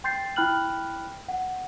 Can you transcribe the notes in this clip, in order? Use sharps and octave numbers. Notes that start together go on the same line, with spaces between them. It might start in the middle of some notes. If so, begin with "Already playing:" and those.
G5 C6 G6 A6 C7
E4 G5 B5 F6 F#6 F#7
F#5